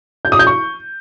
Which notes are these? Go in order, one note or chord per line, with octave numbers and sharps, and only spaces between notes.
G6
D#6
G6
C#6